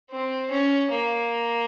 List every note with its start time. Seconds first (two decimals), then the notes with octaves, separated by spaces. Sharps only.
0.11 C4
0.51 C#4
0.91 A#3